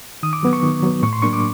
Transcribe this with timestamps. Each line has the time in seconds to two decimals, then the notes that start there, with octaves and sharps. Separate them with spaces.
0.23 D#3 D#6
0.33 D6
0.43 F#3 B3
0.53 C#6
0.63 D#3
0.83 F#3 B3
1.02 A2 C#6
1.13 C6
1.22 F#3 A#3 D4 C#6
1.33 D6